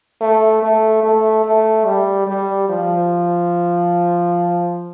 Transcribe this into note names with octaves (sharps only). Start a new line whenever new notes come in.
A3
A3
A3
A3
G3
G3
F3